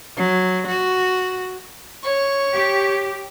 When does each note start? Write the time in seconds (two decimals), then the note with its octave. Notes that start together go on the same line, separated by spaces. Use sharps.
0.17 F#3
0.67 F#4
2.03 C#5 C#6
2.54 G4